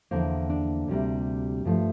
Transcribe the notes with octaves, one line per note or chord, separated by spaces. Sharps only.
E2 D3 F3 A#3 C5
D4
D2 C3 G3 A#3
G2 F3 A3